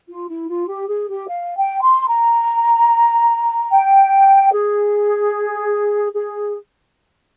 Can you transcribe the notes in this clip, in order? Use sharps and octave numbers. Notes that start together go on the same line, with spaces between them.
F4
E4
F4
G4
G#4
G4
F5
G5
C6
A#5
G5
G#4
G#4